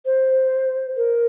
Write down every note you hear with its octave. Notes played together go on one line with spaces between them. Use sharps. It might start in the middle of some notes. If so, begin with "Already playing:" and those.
C5
A#4